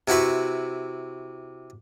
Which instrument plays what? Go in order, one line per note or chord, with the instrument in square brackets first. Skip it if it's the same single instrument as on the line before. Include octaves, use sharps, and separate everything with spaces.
[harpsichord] C3 E4 F#4 B4 C#6